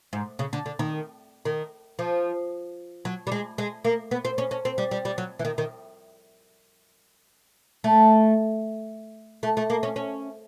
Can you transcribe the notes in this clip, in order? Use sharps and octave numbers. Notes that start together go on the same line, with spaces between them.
G#2
C#3
D3
D3
D#3
D#3
F3
F#3
G3
G#3
G#3
A#3
B3
C4
C#4
C#4
C4
G3
G3
G3
F#3
E3
D#3
D#3
A3
A3
A3
A#3
C#4
C#4